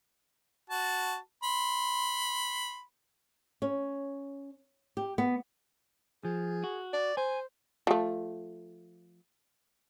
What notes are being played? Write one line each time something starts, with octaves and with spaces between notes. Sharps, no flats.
F#4 A5
B5 C6
C#4
G4
B3
F3 G#4
F#4
D5
C5 G#5
F3 A3